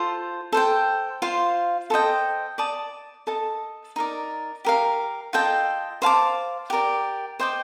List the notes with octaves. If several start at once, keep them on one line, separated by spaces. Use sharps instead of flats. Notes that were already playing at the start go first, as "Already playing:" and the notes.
Already playing: F4 A4 C5
A4 C5 G5
F4 C5 F5
A4 C5 D#5 G5
D5 A5 D#6
A4 D#5 A5
D#4 A#4 D5
G4 A#4 F5
F4 A4 D#5 G5
C5 F5 A5 D6
G4 A#4 D5
C5 D#5 G5 D6